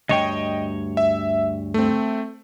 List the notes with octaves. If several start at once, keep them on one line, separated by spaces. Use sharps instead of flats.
D2 G2 C#5 D#5 G5
E5
A3 C4